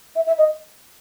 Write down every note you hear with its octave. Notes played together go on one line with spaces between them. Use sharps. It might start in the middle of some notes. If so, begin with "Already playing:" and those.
E5
E5
D#5